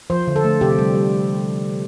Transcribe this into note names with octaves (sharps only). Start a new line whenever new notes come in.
F3 C5
D3
A4
A3
C3 G4
G3
G3